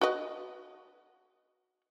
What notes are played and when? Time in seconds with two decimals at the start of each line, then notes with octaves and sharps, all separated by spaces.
0.01 F#4 B4 D#5